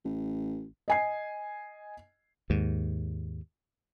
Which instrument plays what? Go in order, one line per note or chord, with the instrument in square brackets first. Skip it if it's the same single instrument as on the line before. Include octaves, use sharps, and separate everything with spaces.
[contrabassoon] A1
[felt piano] D#5 G#5 C7
[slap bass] D#2 G#2